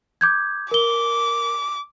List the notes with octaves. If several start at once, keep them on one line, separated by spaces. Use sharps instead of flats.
D6 G6 G#6
A#4 D6 G7